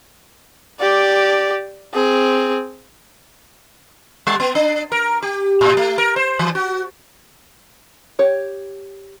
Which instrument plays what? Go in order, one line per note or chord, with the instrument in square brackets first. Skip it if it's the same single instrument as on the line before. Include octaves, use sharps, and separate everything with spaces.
[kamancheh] G4 D5
C4 G#4
[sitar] G3
B3
D4
A#4
G4
A2
A3
A#4
C5
E3
F#4
[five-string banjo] G4 C#5